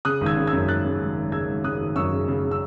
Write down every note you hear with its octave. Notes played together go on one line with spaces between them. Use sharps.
C#3 D#6 F#6
G#1
E6 G#6
C#3
E6 G#6
F#2
G#1 F#6 A6
C#3
G#1
G#1
C#3 E6 G#6
G#1
C#3 D#6 F#6
G#1
F#2 C#6 E6
C#3
C#3
C#3
E6